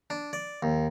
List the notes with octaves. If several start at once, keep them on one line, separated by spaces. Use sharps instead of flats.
D4
D5
D#2